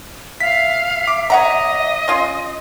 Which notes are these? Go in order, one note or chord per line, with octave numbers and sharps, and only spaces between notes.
E5 F5 B6
D6
C#5 D#5 F#5 A#5
C#4 F4